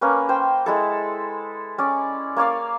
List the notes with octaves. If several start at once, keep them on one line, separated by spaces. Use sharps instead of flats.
A#3 C#4 B4
C5 G5
G#3 E4 A4
C#4 D5
A#3 C#5 D5 F5